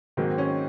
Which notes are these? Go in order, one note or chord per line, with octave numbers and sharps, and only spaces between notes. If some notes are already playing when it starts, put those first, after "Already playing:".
G#2 D#3 F#3 A#3 C4
C#4